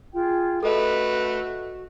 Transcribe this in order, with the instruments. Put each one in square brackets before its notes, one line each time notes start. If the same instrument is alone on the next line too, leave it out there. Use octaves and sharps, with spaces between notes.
[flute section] F4 G#4 G5
[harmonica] A3 B4 [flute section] F#4 [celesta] A4 D#5